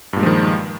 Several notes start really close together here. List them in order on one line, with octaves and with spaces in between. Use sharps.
G2 A#2 G#3 F3 D#3